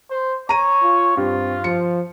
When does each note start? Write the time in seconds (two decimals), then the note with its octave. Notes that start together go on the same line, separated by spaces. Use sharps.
0.10 C5
0.49 C#5 A#5 D#7
0.83 F4
1.17 G2 C4 F4
1.64 F3 C#7